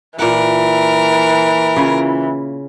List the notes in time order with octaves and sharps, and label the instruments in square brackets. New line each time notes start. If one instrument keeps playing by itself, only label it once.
[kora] A#2 F#5 [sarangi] E3 [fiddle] A#4
[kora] C#3 E4 F4